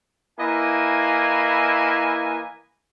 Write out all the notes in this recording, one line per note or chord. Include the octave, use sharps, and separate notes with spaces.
E3 A#3 E4 D#5 G#5